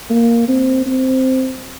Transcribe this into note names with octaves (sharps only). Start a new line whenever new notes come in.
A#3
C4
C4